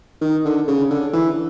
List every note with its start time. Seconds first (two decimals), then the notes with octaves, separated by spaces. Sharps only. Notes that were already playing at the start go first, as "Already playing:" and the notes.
0.21 D#3
0.45 D3
0.68 C#3
0.90 D3
1.13 E3